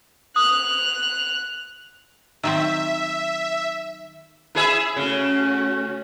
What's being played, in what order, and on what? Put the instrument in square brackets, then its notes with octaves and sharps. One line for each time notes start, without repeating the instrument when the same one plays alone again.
[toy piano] D#6 [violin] F#6 F7
[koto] D#3 F#3 C4 [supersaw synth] E5
[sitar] E4 G#4 E5
[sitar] C#3 [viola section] A3 C#4 F#4